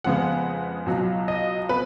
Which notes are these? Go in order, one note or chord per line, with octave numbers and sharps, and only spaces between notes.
F2 C#3 G#3 B3 F#5
C#2 B2 F#3
D#5
B3 B4